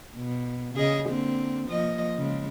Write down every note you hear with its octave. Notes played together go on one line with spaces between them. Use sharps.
B2
C#3 G#4 D#5
D3 A#3 C4
F3 A#3 D#5
C#3 G#3